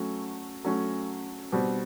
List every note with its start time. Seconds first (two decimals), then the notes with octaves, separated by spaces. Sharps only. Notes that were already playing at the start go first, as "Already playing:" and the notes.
Already playing: F#3 A3 C#4
0.64 F#3 A3 C#4
1.52 B2 G3 C4